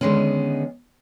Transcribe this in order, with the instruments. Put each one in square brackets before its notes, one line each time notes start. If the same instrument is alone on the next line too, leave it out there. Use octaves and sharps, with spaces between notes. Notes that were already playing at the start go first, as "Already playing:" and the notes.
[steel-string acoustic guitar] D3 D#3 G#3 B3 C#4